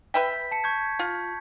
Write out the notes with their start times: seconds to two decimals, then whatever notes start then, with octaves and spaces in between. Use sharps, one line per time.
0.14 B4 E5 G5 B6
0.51 A5 C#7
0.64 C#6 G6 G#6
0.99 F4